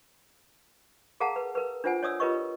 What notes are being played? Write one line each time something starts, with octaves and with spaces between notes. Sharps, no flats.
G#4 A#4 F5 F#5 A5 A#5
B4
A#4 B4
D4 F4 C5 F#5 G#5
C#5 D5 D#6 E6
F4 G4 A#4 B4 D#5 C#6